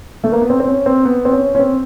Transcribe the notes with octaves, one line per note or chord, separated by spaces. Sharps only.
A3
A#3
B3
C4
C4
C#4
C4
B3
C4
C#4
C#4
C4